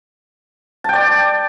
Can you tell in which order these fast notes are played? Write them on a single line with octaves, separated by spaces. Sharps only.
A5 G5 D5